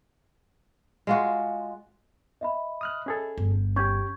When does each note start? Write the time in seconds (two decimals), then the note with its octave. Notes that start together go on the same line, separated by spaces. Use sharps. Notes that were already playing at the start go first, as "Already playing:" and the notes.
1.07 G#3 F4 F#4
2.41 D#5 E5 B5
2.81 D#6 F6 F#6
3.06 C#4 G#4 A4
3.38 G1
3.76 C#4 G4 C#6 G6 G#6